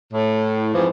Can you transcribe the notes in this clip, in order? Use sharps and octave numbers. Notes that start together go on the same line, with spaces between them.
A2
F2 G#2 E3 F3